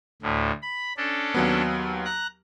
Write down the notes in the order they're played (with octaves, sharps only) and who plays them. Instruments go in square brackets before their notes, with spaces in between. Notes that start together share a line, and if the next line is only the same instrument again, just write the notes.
[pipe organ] D2 A2
B5
C#4 D4 A4
[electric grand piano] D#2 F#3 B3
[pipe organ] A#5 F#6